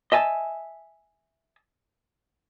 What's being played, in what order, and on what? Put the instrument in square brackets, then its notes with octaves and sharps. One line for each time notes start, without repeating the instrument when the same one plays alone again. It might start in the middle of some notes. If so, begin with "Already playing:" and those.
[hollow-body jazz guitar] D#5 E5 G#5 A5